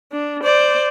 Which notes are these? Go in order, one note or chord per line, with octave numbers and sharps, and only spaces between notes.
D4
C5 D5